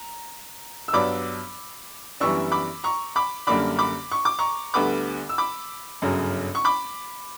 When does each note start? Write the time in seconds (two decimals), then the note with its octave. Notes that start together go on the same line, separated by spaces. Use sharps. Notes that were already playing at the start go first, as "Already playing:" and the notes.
Already playing: A#5
0.88 E6
0.93 G2 F#3 B3 D4 B5 D6
2.20 F#2 E3 G3 B3 D4 C#6 E6
2.52 B5 D6
2.84 A#5 C#6
3.16 B5 D6
3.47 F#2 D3 G3 A#3 D4 B5 D6
3.79 B5 D6
4.11 C#6
4.25 D6
4.39 A#5 C#6
4.74 D2 D3 G3 B3 B5 D6
5.29 E6
5.38 B5 D6
6.02 G1 F#2 C#3 F#3
6.55 C#6
6.65 B5 D6